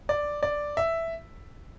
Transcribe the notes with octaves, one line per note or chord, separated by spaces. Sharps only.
D5
D5
E5